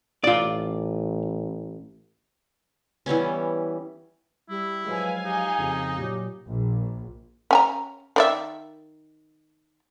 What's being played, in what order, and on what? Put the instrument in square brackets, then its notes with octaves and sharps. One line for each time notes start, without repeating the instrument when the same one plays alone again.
[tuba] A1 [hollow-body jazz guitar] F4 D5
[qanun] E3 G3 B3 C#4
[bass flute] G3 [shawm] E4
[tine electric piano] F3 F#3 G#3 [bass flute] B4 [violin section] F5 G#5
[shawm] D#4 [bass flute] G4
[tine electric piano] F2 C#3 F3
[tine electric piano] A#2 F#3 [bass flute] G4
[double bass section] A#1
[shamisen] C#4 G#5 A#5
D#3 D5 E5